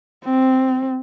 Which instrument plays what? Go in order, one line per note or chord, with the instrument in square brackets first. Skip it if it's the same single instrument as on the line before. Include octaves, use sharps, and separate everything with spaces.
[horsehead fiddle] C4